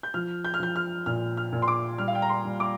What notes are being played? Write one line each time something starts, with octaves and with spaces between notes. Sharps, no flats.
G6
F3 F6
G6
F6
F3 G6
F6
A#2 F6
F6
A#2
C6
D6
G3 F6
F5
G5
A#5
C6
G3
D6